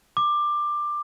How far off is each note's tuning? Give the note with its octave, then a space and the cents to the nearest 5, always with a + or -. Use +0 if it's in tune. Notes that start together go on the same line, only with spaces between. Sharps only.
D6 +15